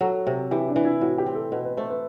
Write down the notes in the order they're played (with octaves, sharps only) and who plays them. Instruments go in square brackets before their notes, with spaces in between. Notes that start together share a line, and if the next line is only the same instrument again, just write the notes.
[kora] F#3 [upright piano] A4
[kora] C3
[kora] E3 [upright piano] G4
[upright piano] D4
[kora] E3
[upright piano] E4
[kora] A2 [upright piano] F#4
[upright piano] G4
[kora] C4
[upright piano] A4
[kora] B2 [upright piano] B4
[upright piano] B4
[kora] A3 [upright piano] C5
[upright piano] B4